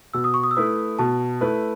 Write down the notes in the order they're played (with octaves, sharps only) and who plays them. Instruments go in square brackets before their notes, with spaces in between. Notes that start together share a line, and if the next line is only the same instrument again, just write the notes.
[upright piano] B2 [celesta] E6
[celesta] D#6
C#6
D#6
E6
[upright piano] A3 E4 B4 [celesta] D#6
[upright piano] B2 [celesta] A5
[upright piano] A3 E4 B4